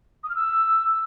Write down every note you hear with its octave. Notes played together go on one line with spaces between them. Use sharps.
D#6
F6
E6